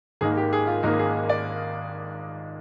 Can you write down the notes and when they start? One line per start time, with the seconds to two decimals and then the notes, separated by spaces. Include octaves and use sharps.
0.21 G#1 G#2 D#3 A#3 G#4
0.37 G4
0.53 G#4
0.67 F4
0.83 G#1 G#2 D#3 A#3 D#4
0.99 G#4
1.29 D5